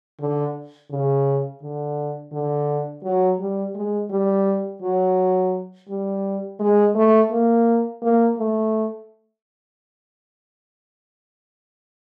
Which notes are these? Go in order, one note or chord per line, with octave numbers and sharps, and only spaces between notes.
D3
C#3
D3
D3
F#3
G3
G#3
G3
F#3
G3
G#3
A3
A#3
A#3
A3